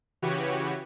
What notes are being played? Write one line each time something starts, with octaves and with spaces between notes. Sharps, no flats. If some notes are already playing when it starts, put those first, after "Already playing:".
C#3 E3 F#4 G4 B4 C#5